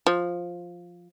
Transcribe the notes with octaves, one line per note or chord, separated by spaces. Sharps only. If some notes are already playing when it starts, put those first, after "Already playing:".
F3